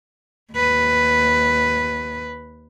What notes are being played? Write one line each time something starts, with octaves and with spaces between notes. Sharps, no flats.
D#2 B4